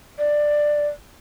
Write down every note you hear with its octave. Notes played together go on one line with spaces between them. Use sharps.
D5